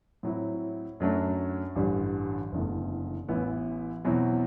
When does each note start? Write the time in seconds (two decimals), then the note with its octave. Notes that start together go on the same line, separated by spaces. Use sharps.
0.23 A2 F#3 C4 E4
1.00 F#2 F#3 A3 D4
1.76 A1 G2 D3 G3
2.52 F#1 E2 D3 A3
3.29 A1 A2 E3 B3 E4
4.05 E2 B2 F#3 C4 E4